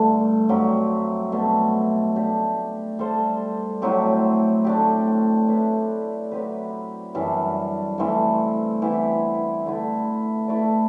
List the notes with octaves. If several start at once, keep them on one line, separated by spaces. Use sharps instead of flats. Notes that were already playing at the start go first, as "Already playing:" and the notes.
Already playing: G2 D3 A3
G2 F#3 C4 G4
B2 A3 D4
A3 D4 G4
G3 D4 A4 C5
A2 F#3 C4 G4
A3 D4 G4
A3 E4 B4
F#3 C4 G4 B4
F#2 E3 G3 D4
G2 E3 A3 C4
E3 B3 E4 G4
D3 A3 E4 B4
A3 E4 B4 D5